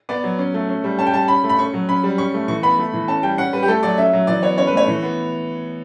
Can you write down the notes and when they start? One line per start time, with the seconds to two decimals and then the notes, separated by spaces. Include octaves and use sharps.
0.09 B3 D5
0.24 F#3
0.39 C#4
0.54 A3
0.69 C#4
0.84 G3
0.98 C#4 A5
1.07 G5
1.14 G3 A5
1.28 C#4 B5
1.44 A3
1.49 B5
1.59 C#4 C#6
1.73 F#3
1.89 C#4 B5
2.03 G3
2.18 C#4 C#6
2.34 A3
2.48 E3 C#6
2.63 B3 B5
2.78 A3
2.93 E3
3.08 C#4 A5
3.23 G3 G5
3.38 C#4 F#5
3.53 G3 B4
3.63 G4
3.68 A3 A4
3.83 F#3 D5
3.98 C#4 E5
4.13 F#3
4.27 E3 D5
4.43 B3 C#5
4.58 C#4 C#5
4.67 B4
4.73 A3 C#5
4.87 E3
5.03 B3